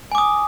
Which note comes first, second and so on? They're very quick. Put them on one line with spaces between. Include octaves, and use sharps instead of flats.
G#5 D6 D#6